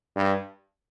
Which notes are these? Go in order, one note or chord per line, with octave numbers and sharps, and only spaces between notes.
G2